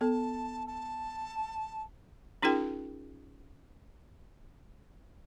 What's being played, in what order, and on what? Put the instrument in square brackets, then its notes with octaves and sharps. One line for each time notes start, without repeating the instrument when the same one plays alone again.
[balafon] B3 A4 [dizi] A5
[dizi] A5
[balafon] C#4 D#4 F4 G#4 A#4 G5